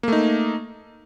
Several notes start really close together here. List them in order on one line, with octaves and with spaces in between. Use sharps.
A#3 A3 D#4